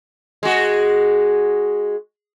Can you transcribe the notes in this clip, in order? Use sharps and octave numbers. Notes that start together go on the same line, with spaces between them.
G#3 F#4